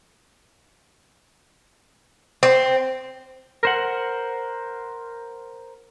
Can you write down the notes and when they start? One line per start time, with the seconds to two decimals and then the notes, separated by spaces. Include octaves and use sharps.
2.43 C4
3.63 A#4 C5 F#5